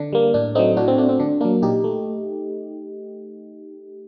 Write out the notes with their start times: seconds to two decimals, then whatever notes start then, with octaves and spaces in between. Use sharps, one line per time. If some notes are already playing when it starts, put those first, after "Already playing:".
Already playing: D3 D4
0.13 G3 A#3
0.34 A2 D4
0.55 F#3 A3 C4 D#4
0.77 A2 D4 F#4
0.88 C4
0.98 A3 D4
1.09 C4
1.19 D3 D4
1.41 F#3 A#3 D4
1.62 A#2 D#4 G4
1.84 A3